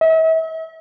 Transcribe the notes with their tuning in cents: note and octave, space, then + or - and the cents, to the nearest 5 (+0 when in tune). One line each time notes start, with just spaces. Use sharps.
E5 -40